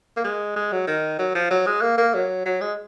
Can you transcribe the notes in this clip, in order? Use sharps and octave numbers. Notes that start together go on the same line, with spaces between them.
A#3
G#3
G#3
F#3
D#3
F#3
F3
F#3
G#3
A#3
A#3
F#3
F#3
G#3